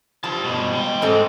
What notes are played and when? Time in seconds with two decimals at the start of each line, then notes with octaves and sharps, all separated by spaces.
0.24 F3 G4 A5
0.44 G2 B2
0.73 G#3 G5
1.02 G#2 G#3 C4 A4